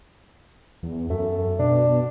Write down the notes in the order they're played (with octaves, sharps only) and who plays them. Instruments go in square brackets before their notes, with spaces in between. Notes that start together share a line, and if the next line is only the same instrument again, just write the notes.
[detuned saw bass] E2
[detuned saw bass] F#2 [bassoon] A3
[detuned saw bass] B2 [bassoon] D4